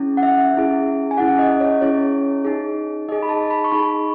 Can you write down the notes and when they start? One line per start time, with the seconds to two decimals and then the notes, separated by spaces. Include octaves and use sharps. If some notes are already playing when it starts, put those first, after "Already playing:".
Already playing: C#4 E4 G#4
0.17 F#5
0.23 E5
0.54 C#4 E4 G#4
1.11 G#5
1.17 C#4 E4 G#4 F#5
1.39 D#5
1.60 C#5
1.81 C#4 E4 G#4 C#5
2.45 D#4 G#4
3.08 D#4 G#4 D#5
3.23 B5
3.29 A5
3.51 B5
3.64 C#6
3.72 D#4 G#4 B5